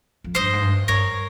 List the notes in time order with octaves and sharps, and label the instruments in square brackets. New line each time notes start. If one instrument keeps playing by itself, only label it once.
[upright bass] F2
[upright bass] G2 [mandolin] C5 D#5
[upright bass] G#2
G2
[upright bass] G2 [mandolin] A#4 C#5